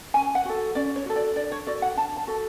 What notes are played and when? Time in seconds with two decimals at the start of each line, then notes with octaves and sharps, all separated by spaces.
0.14 C#4 G#5
0.35 F#5
0.45 F#4 A4
0.75 C#4 D5
0.96 C#5
1.06 F#4 A4
1.16 D5
1.36 D4 D5
1.52 C#5
1.66 F#4 A4 D5
1.82 F#5
1.97 D4 A5
2.17 A5
2.27 F#4 A4